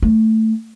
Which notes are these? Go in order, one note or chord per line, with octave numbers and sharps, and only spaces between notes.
A3